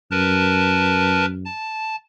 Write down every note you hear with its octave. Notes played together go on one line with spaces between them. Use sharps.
F#2 A#4 B4 A5
A5